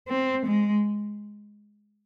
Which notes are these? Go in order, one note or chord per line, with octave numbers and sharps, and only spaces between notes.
C4
G#3